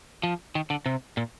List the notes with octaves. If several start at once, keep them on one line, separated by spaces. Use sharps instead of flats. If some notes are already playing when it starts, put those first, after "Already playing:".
F3
D#3
D3
C3
A#2